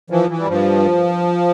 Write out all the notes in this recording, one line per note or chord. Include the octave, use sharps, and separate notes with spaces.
E3 F3
E3
G3
G2 F3